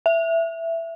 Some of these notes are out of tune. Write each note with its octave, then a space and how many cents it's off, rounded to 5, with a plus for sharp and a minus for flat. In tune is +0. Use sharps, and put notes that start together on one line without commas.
E5 +10